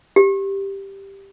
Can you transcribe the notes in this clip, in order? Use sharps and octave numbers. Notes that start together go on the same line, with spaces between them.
G4